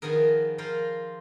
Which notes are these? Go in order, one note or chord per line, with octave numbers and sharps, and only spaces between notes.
D#3 F3 B3 G#4 A#4
F3 F4 A#4 C5